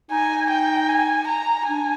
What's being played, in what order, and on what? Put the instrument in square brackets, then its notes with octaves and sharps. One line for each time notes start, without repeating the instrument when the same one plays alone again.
[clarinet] D#4 [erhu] G#5
[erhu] G5
G#5
A#5
[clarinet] D4 [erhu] G#5